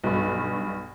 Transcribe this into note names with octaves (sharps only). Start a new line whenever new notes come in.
B1 G2